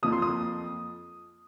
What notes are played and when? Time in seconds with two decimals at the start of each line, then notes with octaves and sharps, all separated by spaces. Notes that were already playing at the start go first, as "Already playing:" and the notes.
0.03 F2 F3 A#3 D#6
0.12 C6
0.22 D#6